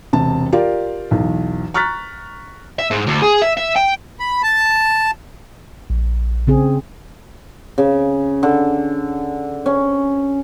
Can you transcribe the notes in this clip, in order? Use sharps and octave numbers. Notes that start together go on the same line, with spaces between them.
E1 C3 A5
F4 G4 A#4 D5 F5
B1 E2
A#5 C#6 F6 F#6 A6 B6
E5
G#2
D2
G#4
E5
E5
G5
B5
A5
A#1
C#3 C4 G#4
C#3
D3
C#4